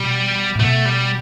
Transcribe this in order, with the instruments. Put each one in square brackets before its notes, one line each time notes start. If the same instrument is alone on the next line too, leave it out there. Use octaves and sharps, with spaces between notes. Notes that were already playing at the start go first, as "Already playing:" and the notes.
Already playing: [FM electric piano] B2 [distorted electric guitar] G3
[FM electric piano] A2
[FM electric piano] B2 [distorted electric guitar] A3
[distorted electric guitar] G3